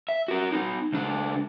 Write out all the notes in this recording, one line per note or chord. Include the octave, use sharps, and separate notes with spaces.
E5
F#4 A#4
D#4 F#4
C#2 D4